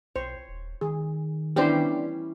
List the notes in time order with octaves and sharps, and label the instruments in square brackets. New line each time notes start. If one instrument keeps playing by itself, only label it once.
[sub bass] B1 [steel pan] C5 [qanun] C#5
[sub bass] D#1
[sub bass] D#3 [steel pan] G#4
[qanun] E3 G3 C#4 [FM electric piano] B3 D4 [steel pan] G4 C5